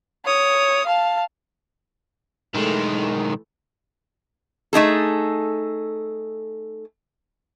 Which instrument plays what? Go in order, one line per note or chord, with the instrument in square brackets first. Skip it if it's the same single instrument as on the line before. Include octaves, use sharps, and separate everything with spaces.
[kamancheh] C#5 D#6
F5 A5
[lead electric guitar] B1 G#3 [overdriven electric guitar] D#3 [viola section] E3 A3
[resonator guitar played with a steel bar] A3 D#4 G#4 A4